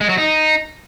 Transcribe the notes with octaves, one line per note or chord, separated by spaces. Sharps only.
G#3
F#3
D#4